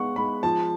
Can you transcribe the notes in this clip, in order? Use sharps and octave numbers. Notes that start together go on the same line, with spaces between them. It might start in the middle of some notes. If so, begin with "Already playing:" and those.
Already playing: G#3 B3 F#5 C#6
G#3 B5
F3 A5